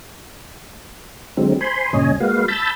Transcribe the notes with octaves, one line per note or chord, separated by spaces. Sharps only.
D3 F#3 G#3 C4
C5 G#5 B5 C6
G2 A#2 C#3 C#5 D#5 G#5
G#3 A#3 F#4 B4 F5
A5 B5 E6 G6 A6